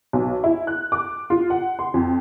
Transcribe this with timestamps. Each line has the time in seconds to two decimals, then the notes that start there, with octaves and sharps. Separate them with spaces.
0.13 B1
0.44 E4
0.67 F#6
0.92 D6
1.30 F4
1.50 F#5
1.79 C6
1.94 F2